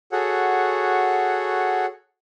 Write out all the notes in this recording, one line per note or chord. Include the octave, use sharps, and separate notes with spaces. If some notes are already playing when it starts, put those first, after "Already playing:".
F#4 G#4 A4 C#5 F#5